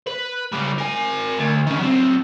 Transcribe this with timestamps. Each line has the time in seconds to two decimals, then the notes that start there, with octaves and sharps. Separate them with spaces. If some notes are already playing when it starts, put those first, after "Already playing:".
0.07 B4
0.52 C#3 G3
0.78 A#4 G#5
1.39 D2
1.67 D#3 C#4
1.79 F#3 C4